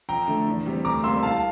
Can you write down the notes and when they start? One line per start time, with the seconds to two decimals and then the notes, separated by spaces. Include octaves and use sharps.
0.09 F2 G5 A#5
0.28 D3 A3
0.46 E2
0.66 C3 G3
0.85 D2 A#5 D6
1.04 C3 G3 A#3 C6 E6
1.23 C2 F5 A5